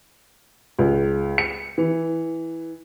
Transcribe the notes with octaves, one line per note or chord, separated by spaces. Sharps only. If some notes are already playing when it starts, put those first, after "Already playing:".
C#2
C#7
E3